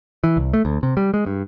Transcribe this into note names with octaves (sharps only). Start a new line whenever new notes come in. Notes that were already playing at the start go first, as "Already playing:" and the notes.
E3
C2
A3
D2
C3
G3
G#3
G2